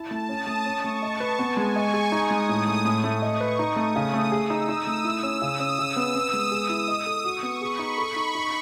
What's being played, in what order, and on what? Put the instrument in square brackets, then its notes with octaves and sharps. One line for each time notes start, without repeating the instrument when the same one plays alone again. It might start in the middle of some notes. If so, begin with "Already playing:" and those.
Already playing: [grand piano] E4 [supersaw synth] A5
[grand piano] A3
[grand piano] C#4 [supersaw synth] D#6
[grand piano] A3
[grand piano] C#4 [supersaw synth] C#6
[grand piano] A3
[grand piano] D#5 [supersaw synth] A5
[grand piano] B4
[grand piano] B3 [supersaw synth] G#5
[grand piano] G#3
[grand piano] D#5 [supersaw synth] C#6
[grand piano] G#4
[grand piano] D#4 [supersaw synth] D#6
[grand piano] G#3
A2
A3
A2
A3
[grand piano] D#5 [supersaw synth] C#6
[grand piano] B4
[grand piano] D#4 [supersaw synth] D#6
[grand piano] A3
[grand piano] C#3 [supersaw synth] D#6
[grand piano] A3
[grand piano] G#4 [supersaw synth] E6
[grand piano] D#4
[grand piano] D#4 [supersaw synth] D#6
[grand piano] A3
[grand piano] E4 [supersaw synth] E6
[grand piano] C#4
[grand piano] C#3 [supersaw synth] D#6
[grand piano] C#4
[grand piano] C#3 [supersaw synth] E6
[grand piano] B3
[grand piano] B3 [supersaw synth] D#6
[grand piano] G#3
G#4
E4
D#5
A4
[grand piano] F#4 [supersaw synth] C#6
[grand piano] B3
[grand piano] G#4 [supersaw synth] B5
[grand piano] D#4
A4
D#4
D#4